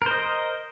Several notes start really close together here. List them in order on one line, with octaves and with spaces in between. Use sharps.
A#4 C5 D#5